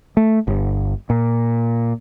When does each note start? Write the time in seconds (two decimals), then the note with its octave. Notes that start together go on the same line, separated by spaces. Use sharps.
0.17 A3
0.47 G1
1.10 A#2